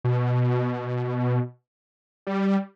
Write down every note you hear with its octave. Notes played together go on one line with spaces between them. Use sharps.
B2
G3